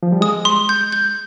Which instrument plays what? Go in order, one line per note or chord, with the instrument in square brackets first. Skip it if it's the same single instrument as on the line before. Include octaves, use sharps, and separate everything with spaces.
[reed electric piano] F3
G3
[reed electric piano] G#3 [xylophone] D#6
[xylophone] C6
G6
G6